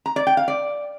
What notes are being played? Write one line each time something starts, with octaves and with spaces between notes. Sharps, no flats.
A#5
D5
G5
F5
D5